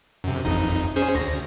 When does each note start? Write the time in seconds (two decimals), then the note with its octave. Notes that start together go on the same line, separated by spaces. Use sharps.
0.24 F#2 C3
0.45 A1 F2 D#4
0.96 C#4 G#4 C5
1.15 D2 A#6